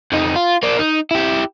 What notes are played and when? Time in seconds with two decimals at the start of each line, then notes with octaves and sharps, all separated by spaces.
0.12 F2 D#4
0.36 F4
0.63 A#3 D4
0.79 D#4
1.11 E4 G4